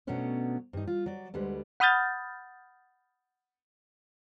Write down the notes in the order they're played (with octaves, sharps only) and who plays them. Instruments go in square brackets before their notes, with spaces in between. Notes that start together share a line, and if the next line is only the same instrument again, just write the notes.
[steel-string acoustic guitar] B2 F#3 A3 B3 C#4 D4
G2 D#4
F4
F#3 D5
D2 D3 G3 G#3 B4
[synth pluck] F#5 B5 D#6 F6 G6 A6